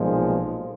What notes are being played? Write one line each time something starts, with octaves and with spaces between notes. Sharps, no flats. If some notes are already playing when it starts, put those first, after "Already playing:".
Already playing: B1 A#2 F3 G#3